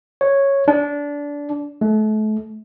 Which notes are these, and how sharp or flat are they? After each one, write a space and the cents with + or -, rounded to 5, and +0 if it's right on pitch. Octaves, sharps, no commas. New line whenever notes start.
C#5 -5
D4 -20
A3 -35